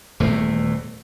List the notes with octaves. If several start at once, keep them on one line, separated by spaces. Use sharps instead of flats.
D#1 E2 A2 A3